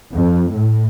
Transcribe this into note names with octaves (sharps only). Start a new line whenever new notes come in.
F2
A2